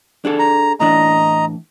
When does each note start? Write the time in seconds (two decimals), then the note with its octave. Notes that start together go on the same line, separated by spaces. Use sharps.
0.25 D4 G#4 A4
0.39 A#5
0.80 A2 E3 D4 D#5 A#5